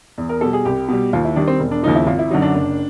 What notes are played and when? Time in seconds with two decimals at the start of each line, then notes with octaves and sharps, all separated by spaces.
0.18 E2
0.29 A#4
0.41 B2 G3 A4
0.53 G#4
0.65 C2 G4
0.88 B2 G3
1.13 D#2 F4
1.25 E4
1.36 D#3 G3 D4
1.48 C4
1.60 E1
1.71 D4
1.83 D#2 C#3 F3 D#4
1.95 E4
2.07 G#1 F4
2.19 E4
2.31 F#2 D3 F#3 D#4
2.42 D4
2.55 F#1